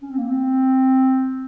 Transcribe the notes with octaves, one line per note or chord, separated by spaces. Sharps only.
C#4
C4
A#3
C4